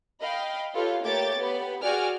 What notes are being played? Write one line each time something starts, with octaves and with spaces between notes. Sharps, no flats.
D#5 F5 G5 B5
F4 G4 A4 B4 C#5 F5
A3 A#3 G4 C#5 D6 A6
B3 G4 B5
F#4 G#4 D5 G5 G#5 F6